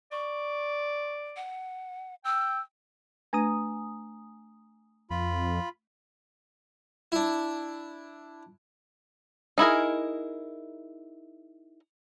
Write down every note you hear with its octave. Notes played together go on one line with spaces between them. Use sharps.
D5 C#6
F#5
G5 E6
A3 D4 B4 G#5 A#5 D#6
F2 F4 B5
D4 E4
D#4 E4 G#4 A#4